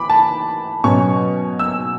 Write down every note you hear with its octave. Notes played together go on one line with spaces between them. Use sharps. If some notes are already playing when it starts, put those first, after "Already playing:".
Already playing: E3 B5 D6
A5
B2 F#3 C#4 C#6
E6